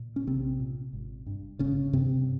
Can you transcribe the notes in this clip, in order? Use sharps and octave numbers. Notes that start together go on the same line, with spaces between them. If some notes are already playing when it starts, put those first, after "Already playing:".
Already playing: A#2
C#4
A#1 C3 C4
A#2
G#1
G2
G#1 C#3 C#4
G2 C3 C4